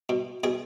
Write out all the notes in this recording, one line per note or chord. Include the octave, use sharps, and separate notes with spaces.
B2
B2 G#4